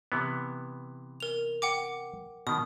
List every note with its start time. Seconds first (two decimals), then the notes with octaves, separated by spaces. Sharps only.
0.12 C3 E3 B3
1.20 A#4 F7
1.62 F#5 G5 D6
2.47 B2 D#3 D#6